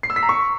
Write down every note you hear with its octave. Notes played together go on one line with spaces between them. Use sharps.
C7
E6
B6
A#5
C#6